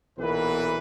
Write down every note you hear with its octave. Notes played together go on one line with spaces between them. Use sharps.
B1 A#2 E3 B3 A#4 B4